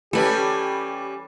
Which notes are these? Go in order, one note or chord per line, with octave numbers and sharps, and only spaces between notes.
E3 G3 C#4 G4 A4 B4